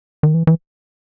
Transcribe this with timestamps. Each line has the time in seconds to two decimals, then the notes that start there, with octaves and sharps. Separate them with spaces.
0.23 D#3
0.34 E3
0.47 E3